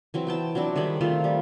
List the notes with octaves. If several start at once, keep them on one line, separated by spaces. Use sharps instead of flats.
E3 F#3 C4
B3 G5 A5
F#3 C4 D4 E4
D#3 G3 G#4 B5
D#3 A3 C4 F4
G3